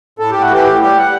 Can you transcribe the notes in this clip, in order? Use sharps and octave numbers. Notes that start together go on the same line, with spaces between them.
A2 A4
A2 G4
F#4
E3 G4
A2
G3 G4
G3 F#5